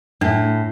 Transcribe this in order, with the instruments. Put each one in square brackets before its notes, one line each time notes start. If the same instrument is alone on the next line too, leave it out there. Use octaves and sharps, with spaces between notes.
[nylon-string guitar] A2 [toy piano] D4